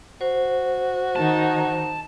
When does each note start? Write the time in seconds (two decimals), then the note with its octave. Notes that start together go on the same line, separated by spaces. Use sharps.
0.21 F#4 C5
1.16 D#3 D#4 A5